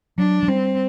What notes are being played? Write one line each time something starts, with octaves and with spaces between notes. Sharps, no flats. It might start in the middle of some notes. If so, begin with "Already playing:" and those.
F#3 D4
F#3
G3 C4